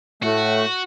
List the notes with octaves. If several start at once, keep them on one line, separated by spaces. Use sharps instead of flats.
A2 A3 F#4